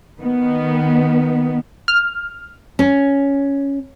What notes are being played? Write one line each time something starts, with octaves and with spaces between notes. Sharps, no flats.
D#3 B3
F6
C#4